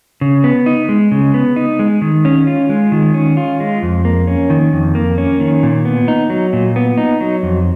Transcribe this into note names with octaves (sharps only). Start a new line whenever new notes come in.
C#3
B3
D#4
G#3
C#3
B3
D#4
G#3
D#3
C#4
F4
G#3
D#3
C#4
F4
G#3
F2
A#3
C#4
D#3
F2
A#3
C#4
D#3
A#2
B3
D#4
F#3
A#2
B3
D#4
F#3
F2